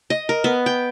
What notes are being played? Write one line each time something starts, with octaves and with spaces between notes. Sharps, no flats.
D#5
A#4
B3
G5